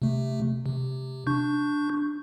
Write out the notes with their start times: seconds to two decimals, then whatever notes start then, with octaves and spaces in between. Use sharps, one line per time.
0.02 C3 A3
0.66 C3
1.27 D4 C#6 G6